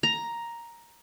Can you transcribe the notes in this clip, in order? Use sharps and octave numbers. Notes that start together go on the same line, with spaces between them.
A#5